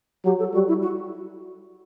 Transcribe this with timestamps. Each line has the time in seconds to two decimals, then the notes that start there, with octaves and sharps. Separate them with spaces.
0.25 F#3 G4
0.39 A4
0.54 G3 F#4
0.68 E4
0.82 F#4